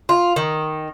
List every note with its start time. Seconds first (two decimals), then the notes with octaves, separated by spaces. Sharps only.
0.09 F4
0.36 D#3